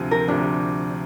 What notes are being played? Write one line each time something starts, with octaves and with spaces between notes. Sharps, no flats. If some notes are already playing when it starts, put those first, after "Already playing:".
Already playing: D2 C3 F3
A#4
D2 C3 F3 D4